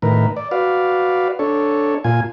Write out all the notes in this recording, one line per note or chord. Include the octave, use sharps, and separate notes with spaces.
A2 D#3 A#4 B4
D5
F#4 B4 D5 F5
D4 A4 C#5
A#2 F4 G#5